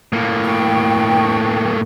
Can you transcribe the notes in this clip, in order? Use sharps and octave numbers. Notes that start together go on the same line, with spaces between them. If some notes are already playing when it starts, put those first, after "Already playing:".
A2 A#3
G5 C#6